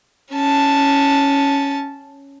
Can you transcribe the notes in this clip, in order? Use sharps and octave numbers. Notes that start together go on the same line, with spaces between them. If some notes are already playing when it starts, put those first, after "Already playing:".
C#4 A5